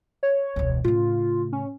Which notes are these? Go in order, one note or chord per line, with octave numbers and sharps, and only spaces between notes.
C#5
E1 C#2
A2 C#3 F4
C#4